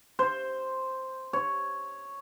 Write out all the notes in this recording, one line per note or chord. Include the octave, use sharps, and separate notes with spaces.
C5
C#5